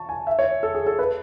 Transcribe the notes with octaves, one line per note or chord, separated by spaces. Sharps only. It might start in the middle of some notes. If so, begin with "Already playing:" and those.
Already playing: A5 C#6
G#5
E5
C#5
A4
G#4
A4
B4